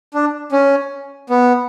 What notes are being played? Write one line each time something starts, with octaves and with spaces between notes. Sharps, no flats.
D4
C#4
B3